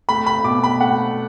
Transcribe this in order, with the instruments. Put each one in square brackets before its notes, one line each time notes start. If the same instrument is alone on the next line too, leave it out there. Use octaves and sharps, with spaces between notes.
[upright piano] A3 B5
B5
B2 D6
B5
A3 F#5